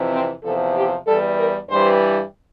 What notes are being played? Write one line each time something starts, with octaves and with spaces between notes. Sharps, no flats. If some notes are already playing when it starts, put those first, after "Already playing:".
Already playing: F2 C3 E3
C4
E2 C3 F3 A4
G4
E2 E3 G3 A4
A#4
G2 E3 G3 C5